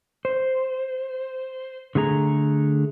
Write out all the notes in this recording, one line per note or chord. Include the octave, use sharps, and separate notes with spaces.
C5
D3 A3 G#4 A#5